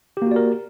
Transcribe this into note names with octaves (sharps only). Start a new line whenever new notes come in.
A#3 F#4 G4 A#4 D5